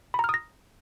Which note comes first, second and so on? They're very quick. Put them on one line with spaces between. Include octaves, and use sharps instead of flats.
B5 A#5 F6 D#6 A#6